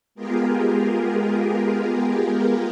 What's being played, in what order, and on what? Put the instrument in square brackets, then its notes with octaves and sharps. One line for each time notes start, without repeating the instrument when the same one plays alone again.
[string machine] G#3 B3 F4 G4 G#4 A#4